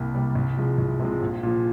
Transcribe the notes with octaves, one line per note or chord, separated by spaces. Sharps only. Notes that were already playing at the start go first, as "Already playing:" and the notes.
Already playing: C2 C3 G3 A#3
C3 G3 A#3
C2
C3 F3 G#3
C2
C3 F3 G#3
A#1
A#2 F3